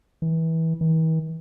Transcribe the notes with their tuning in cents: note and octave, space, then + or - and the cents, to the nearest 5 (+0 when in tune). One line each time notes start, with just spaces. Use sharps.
E3 -25
E3 -45